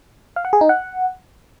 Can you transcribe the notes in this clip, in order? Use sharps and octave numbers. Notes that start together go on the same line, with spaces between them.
F5
F#5
G#4
D#4
F#5